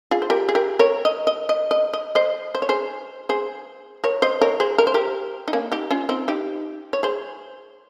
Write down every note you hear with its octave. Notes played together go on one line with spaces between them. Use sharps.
F4 G#4
C5
G4 A#4
G#4
G4 A#4
A#4 C#5
D#5
D#5
D#5
D#5
D#5
C5 D#5
C5
C#5
G#4 C5
G#4 C5
A#4 C#5
C5 D#5
A#4 C#5
G#4 C5
A#4
C5
G4 A#4
D#4
A#3 C#4
D#4 G4
C#4 F4
C4 D#4
D#4 G4
C#5
G#4 C5